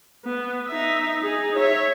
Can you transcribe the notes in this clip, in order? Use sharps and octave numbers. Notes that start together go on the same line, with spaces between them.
B3
D#4 E5
D#4 G#4
C#5 E5